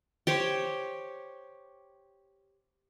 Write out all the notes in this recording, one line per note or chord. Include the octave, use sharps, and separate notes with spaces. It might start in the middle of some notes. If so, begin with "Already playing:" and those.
G4 C5 C#5 G5